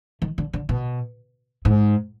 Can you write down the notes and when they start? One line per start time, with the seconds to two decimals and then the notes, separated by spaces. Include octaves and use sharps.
0.22 D#3
0.38 D3
0.53 D3
0.69 B2
1.65 G#2